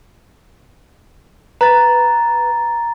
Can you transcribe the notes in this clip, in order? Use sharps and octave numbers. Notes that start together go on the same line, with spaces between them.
B4 A#5 A6